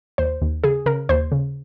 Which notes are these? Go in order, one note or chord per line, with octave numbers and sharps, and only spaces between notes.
D#2 C5
D#2
C#3 G#4
C#3 A#4
D#2 C5
C#3